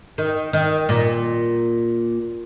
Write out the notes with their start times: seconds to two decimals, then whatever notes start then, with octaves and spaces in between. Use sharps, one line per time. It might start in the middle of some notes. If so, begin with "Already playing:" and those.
0.18 D#3
0.53 D#3
0.89 A#2